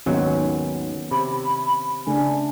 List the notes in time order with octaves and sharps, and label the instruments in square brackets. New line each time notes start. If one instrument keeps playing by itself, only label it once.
[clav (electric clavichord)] D#2 G#2 F#3 [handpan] D#3 B3 C#4
[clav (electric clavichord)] C3 [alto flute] B5
[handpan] C#3 A3 D4 [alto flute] G#5